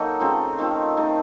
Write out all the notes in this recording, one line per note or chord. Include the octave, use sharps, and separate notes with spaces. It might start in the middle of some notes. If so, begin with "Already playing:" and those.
Already playing: F#3 A#3 D#4 A4
C#3 A3 C4 F4
D#3 A3 C4 F4
C3 D#3 A3